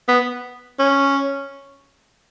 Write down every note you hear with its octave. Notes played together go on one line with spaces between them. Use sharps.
B3
C#4